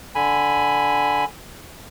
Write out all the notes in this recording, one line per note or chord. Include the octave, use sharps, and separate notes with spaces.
D3 G#5 B5